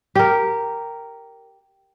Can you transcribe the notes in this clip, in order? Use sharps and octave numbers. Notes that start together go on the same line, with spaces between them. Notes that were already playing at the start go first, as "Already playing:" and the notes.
G4 A#4